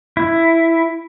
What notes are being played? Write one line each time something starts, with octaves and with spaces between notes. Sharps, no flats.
E4